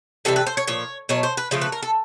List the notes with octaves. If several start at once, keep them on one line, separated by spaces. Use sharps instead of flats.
C3 E3 G3 A4
B4
C5
C#5
A#2 F3 C#5
B2 F#3 A3 C#5
C5
B4
C#3 F3 A3 C5
B4
A#4
A4